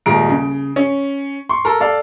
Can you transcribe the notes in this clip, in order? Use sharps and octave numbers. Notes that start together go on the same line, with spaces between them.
D#1 D#2 G#3 A#5 D7
C#3
C#4
C6 C#6
A4 A#4
A4 D5 F5